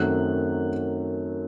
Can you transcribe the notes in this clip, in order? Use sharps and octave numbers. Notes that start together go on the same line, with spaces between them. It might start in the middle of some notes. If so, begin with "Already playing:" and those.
Already playing: F#2 D#3 F#3 A3 C4 F#6